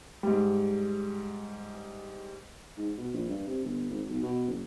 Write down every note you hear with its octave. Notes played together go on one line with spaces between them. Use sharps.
G#2 G3
G#2
B2
A#1
G2
C3
G1
G#1
B1
B2
F#1